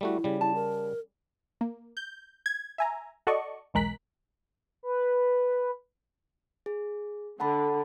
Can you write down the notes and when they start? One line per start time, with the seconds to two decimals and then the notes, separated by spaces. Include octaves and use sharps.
0.01 G3 A3 E4 F#4
0.24 C#3 G3
0.41 E4 A5
0.55 A#4
1.61 A#3
1.97 G6
2.46 G#6
2.78 E5 G#5 A#5
3.27 F#4 A4 D5 D#5 C#6
3.74 B1 E2 G#3 A#4 F#6 B6
4.83 B4
6.66 G#4
7.40 D3 F#5 A5 B5